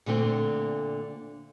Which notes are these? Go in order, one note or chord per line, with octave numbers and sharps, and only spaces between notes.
A#2 D3 A3 C4